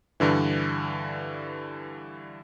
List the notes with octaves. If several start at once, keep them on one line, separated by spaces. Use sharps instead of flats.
G2 D3 E3